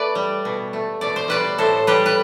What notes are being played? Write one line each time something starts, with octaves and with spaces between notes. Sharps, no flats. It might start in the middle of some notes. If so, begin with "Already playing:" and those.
Already playing: A3 B4 D5
G3
B2
A3
B2 D5
C5
G3 B4 D5
A2 A4 C5
G3 G4 B4
B4